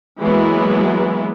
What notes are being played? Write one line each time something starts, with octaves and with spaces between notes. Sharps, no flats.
E3 F#3 G#3 A#3 B3 E4